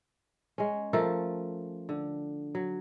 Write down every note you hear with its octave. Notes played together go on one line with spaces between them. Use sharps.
G#3 C#4
F3 A3 A4 A#4
D3
F#3